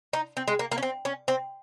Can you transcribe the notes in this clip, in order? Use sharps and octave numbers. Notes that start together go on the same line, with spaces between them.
D#4
C4
G#3
A#3
A#3
C#4
C4
C#4
C4